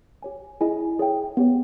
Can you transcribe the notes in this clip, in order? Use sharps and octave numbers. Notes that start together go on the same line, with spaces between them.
G4 C#5 G#5
E4 G#4 D#5 G#5
G#4 C#5 E5 G5
B3 G4 C#5